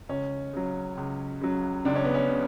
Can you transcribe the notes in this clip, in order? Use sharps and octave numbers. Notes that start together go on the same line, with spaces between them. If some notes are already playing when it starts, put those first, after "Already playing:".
C#2 C#4
C#3 F#3
C#2
C#3 F#3
C#2 D4
C#4
B3
C#4
C#3